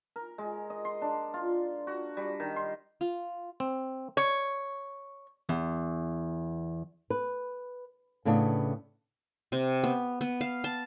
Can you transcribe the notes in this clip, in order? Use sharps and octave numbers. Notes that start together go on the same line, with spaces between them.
A#4
G#3
D#5
C6
D4
F4
F#4
G3
D#3
C6
F4
C4
C#5
E2
B4
A2 C#3 B3 D4
C3
B3
B3
F5
A5